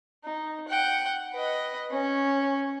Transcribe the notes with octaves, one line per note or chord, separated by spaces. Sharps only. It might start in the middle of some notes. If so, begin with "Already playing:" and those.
D#4
F#5 G5
B4 D#5
C#4